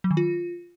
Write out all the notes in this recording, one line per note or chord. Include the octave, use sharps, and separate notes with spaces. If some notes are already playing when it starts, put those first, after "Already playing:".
F#3
D#3
F4